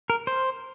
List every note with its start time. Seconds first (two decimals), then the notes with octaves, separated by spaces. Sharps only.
0.10 A#4
0.27 C5